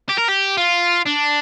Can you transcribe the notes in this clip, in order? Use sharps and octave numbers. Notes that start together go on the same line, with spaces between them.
G4
A#4
G4
F4
D4